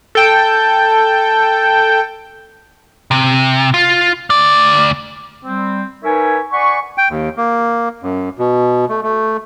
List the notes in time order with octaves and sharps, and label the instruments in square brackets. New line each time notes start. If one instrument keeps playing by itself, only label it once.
[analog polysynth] A4 G5
[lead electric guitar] C3
F4
D2 D5
[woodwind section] G3 C4
D#4 A#4 B4 C#5 E5 G#5
D5 F#5 G#5 B5 C#6
[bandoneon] G5
D#2
A#3
F#2
B2
A3
A3